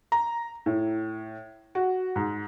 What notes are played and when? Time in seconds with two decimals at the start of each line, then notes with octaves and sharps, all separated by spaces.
0.12 A#5
0.66 A2
1.75 F#4
2.16 G#2